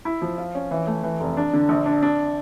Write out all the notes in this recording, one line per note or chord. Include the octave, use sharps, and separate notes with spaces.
E4
F3
F4
C#4
E3
A3
E3
F1
D4
D3
A#1
D4
D4